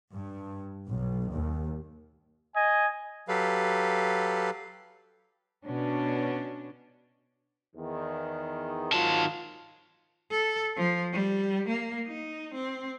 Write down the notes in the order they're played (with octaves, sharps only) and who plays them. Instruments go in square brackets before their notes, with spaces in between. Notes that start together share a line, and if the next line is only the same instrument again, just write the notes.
[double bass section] G2
B1
D#2
[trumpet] D#5 [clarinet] G#5
[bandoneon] F#3 G4 A4 B4 F5
[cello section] B2 C#4 D4
[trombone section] E2 D#3
[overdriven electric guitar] D#3 A5 [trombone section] F3 F#3 F4
[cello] A4
F3
G3
A#3
D#4
C4